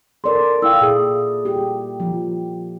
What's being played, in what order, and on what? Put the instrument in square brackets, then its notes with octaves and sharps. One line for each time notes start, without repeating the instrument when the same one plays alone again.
[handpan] A4 D5 [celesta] A#4 C6
[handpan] E4 [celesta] F5 G5 E6
[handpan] A#2 [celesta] G#4 D#6
[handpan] G4
[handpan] F3 [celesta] F4